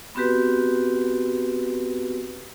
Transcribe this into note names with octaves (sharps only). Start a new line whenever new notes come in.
B3 C4 F#4 G4 B4